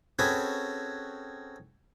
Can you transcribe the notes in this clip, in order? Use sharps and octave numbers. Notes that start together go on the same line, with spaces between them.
C4 C#4 F#4 G#4 A4 B4